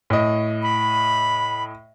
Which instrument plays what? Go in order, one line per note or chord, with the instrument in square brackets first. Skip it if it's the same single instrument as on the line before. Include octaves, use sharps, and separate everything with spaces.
[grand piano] A2 D#5
[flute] B5